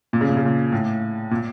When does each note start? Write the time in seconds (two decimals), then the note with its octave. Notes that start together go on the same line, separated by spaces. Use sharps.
0.13 A#2
0.21 C#3
0.29 A#2
0.37 C#3
0.45 A#2
0.72 A2
1.31 A#2